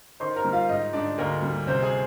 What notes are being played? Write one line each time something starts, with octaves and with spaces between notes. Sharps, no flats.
D#3 C5 C6
A#4 A#5
G3
F4 F5
G#2 D#4 D#5
G#2 D4 D5
D2 A#3 A#4
G3
C3 C4 C5
G#4 G#5